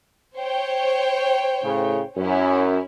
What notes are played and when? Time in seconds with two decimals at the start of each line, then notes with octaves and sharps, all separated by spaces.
0.36 C5 C#5 G5
1.64 A2 C#3
2.17 F#2 C#4 E4